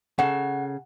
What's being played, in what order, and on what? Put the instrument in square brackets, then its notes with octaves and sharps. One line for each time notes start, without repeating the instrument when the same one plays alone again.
[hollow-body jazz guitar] C#3 A4 [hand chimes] F#5